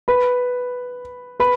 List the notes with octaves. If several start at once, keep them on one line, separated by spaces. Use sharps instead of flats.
B4 B5
B4 B5